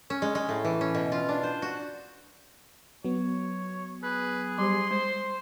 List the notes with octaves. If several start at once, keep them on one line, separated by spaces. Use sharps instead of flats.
C#4
G#3
G#3
A2
E3
C#4
B2
F4
D4
C5
F#4
F#3 B3 C#5
G#4 B4
G3 G4 C5 C6
G#3 C5